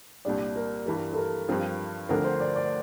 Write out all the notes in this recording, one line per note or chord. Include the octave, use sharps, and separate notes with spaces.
C2 A#2 G3 D4 D5
A#4
G2 E3 G3 A#4
A4
A#4
G2 F3 C4 F4
D2 D3 F3 C4 A#4
C5
D5
D5